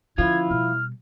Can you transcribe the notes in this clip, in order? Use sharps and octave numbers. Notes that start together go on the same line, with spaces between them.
D3 F3 C#4 E4 F4 G#6
B2 G3 F6